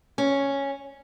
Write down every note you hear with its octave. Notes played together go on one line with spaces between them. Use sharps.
C#4